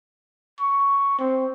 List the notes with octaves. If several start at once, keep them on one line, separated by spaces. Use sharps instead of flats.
C#6
C4